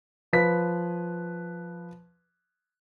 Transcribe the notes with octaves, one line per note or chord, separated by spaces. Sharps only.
F3 B4 B6